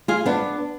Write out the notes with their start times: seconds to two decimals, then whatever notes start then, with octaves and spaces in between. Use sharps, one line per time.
0.08 F4 G#4
0.26 B3 D4